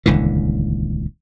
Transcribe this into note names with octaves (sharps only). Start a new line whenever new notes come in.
D#1 C#2 D3 E3